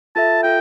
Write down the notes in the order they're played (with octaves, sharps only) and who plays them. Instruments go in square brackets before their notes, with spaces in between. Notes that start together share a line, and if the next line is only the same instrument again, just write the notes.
[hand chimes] F4 A4 E5 [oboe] A5
[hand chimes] F4 A4 [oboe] G5